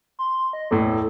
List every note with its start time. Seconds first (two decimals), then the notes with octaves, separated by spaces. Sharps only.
0.19 C6
0.53 D#5
0.71 E2 A2 A4